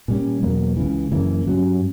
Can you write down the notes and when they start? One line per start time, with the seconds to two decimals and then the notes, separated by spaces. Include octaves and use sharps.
0.08 A#2 G3 C#4
0.42 E2 B2 F#3 A#3
0.77 C#2 C#3 E3
1.11 F#2 C#3 E3 A#3
1.46 G2 F#3 C#4